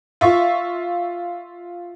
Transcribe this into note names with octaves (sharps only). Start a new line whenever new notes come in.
F4 E5 C#6